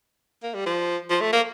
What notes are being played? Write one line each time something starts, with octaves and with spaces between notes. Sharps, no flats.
A#3
G3
F3
F3
A3
A#3